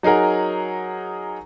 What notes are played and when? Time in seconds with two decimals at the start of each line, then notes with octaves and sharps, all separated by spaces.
0.03 F#3 D#4 G#4 A#4 F#5